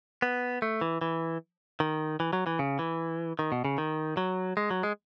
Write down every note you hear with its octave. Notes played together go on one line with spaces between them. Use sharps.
B3
A3
E3
E3
D#3
E3
F#3
E3
C#3
E3
D#3
B2
C#3
D#3
F#3
G#3
F#3
G#3